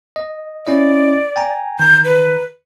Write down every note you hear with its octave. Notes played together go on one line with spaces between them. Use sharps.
D#5
C#4 E4 D5 D#5
G5 G#5 A#5
D#3 A#5 G6
B4